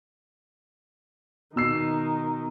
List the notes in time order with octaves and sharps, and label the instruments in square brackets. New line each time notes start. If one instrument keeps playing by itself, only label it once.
[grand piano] B2 E6 C7 [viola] D#3